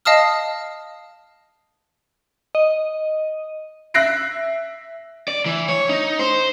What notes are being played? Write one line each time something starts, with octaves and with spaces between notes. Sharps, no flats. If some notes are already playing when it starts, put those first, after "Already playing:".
D#5 F5 A5 D#6 F6
D#5
E5 F#6 A#6 C7 D7
D5
E3
C#5
D#4
C5